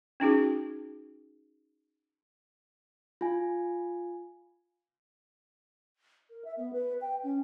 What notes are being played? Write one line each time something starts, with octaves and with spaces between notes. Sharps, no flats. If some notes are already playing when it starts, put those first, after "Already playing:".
C#4 D#4 F#4 G#4
F4 G#5
A#4
E5
B3
B4
G5
C#4